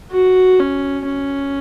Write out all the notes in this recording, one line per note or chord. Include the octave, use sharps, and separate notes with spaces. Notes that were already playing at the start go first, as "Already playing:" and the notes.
F#4
C#4
C#4